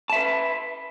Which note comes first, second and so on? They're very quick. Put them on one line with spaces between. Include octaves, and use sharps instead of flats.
A5 E5 B4